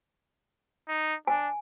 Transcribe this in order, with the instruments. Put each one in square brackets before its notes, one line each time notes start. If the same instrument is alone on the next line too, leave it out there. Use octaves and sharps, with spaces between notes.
[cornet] D#4
[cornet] D4 [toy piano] G#5